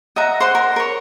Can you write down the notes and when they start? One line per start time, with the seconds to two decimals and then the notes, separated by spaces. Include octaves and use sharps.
0.16 D#5 E5 F#5 A#5
0.40 C5 F#5 C6
0.55 A#4
0.76 A#4 C#5